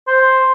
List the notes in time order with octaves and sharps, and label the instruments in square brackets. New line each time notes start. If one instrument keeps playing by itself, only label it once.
[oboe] C5